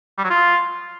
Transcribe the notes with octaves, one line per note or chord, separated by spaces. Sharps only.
G3
F#3
F4